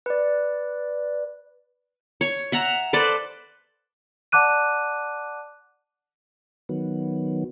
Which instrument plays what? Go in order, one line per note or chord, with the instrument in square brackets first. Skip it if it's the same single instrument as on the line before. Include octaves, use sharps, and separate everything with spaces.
[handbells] B4 D5
[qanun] C#5
E5 F#5 A#5
A4 B4 C5 D5
[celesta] D5 F#5 A5 D6 F#6 D#7
[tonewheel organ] D#3 F#3 B3